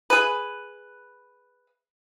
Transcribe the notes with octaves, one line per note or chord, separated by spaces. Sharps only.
G#4 B4